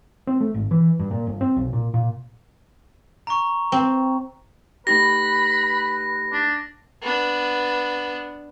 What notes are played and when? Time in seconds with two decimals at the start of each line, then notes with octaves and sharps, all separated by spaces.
0.27 C4
0.41 A3
0.54 G#1
0.71 E3
0.99 G2
1.11 A#2
1.27 G1
1.41 C4
1.56 B1
1.73 A#2
1.94 A#2
3.27 A#5 C#6
3.72 C4
4.87 A3 D#4 G4 B4 B5 A#6
6.32 D4
7.02 B3 D4